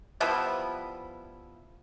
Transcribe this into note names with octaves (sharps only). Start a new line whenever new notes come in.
F3 G3 B3 E4